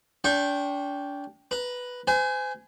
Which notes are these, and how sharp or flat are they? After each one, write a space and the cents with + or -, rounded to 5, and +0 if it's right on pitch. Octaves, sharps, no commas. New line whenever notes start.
D4 -35 G5 +0 C#6 -35
B4 +0 A#5 +15
C5 -40 G#5 +0